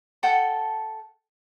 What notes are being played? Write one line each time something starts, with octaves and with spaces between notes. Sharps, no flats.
A4 F#5 G5 A5